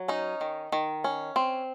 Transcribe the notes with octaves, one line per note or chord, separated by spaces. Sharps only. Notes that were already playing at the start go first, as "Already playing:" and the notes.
Already playing: F#3
C#4 D#4
D#3
D#3
C#4
C4